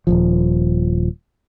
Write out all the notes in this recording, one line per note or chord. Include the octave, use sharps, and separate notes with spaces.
D#1 A#1 F3